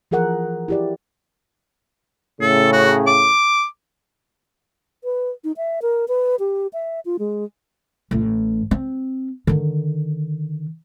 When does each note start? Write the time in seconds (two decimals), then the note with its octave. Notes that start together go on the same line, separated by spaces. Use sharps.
0.11 E3 F3 G#4 A#4 F#5
0.68 E4 G4 D5
2.41 A2 C#3 A4
2.73 F#4
3.07 D6
5.04 B4
5.44 D#4
5.57 E5
5.82 A#4
6.08 B4
6.39 G4
6.73 E5
7.05 F4
7.19 G#3
8.11 A1 A2
8.71 C4
9.47 D3 D#3